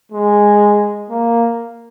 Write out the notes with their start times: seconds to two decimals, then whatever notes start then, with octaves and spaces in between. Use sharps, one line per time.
0.12 G#3
1.10 A#3